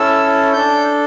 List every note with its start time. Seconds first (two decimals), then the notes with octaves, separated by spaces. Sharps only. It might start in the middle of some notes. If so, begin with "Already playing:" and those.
Already playing: C#4 E4 A4 E6
0.53 D4 A4 G6